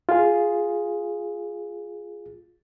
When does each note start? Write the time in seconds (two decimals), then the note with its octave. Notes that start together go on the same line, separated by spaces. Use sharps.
0.09 F4 G#4